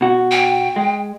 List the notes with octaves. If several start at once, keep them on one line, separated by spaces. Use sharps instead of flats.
B2 F#4
G5
G#3